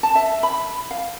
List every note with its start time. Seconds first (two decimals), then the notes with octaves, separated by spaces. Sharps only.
0.03 A5
0.15 E5
0.43 B5
0.91 F5